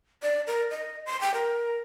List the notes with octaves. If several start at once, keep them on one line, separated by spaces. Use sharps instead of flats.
D5
A#4
D#5
C6
G5
A#4